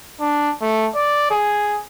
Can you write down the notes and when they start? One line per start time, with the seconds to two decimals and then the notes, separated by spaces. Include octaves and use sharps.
0.21 D4
0.62 A3
0.96 D5
1.31 G#4